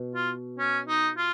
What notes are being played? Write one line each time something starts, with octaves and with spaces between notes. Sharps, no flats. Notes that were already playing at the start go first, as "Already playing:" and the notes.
Already playing: B2
F4
C#4
D#4
F4